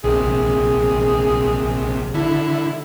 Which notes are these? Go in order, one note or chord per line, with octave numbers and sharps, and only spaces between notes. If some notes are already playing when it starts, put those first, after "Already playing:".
A#1 C3 G#4
D3 E4